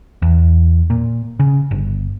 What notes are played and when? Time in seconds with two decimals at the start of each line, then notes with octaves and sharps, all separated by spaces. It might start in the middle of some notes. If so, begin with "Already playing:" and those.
0.22 E2
0.90 A#2
1.40 C#3
1.71 G1